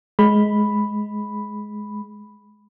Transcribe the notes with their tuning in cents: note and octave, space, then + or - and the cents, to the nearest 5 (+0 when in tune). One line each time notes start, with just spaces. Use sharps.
G#3 +15 B5 +0